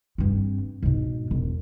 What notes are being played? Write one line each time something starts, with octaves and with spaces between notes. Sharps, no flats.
G2 C4
G#2 B2
E1